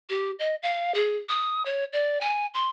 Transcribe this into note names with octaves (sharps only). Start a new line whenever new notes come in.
G4
D#5
F5
G#4
D#6
C#5
D5
G#5
C6